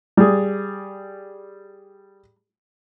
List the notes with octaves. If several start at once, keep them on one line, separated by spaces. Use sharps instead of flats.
G3 G#4